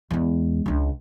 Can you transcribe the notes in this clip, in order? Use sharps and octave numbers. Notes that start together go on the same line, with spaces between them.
E2 G#3
C#2 D4